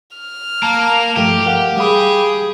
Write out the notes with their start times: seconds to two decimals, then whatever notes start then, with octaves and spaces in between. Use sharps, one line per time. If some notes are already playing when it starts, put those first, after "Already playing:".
0.17 F6
0.63 A#3 A5
1.16 G2 F3 A3 G4
1.46 A#4 F5 F#5
1.77 G3 G#4 F5 B5